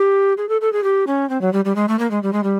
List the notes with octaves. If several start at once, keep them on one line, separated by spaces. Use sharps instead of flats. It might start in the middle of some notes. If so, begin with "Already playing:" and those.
Already playing: G4
G#4
A4
A4
G#4
G4
C#4
C4
F#3
G3
G3
G#3
A3
A#3
G#3
G3
G#3
G3